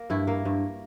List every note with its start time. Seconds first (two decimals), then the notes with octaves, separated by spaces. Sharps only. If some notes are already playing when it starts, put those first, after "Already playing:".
Already playing: A#3
0.10 G2 E4
0.27 A#3
0.45 G2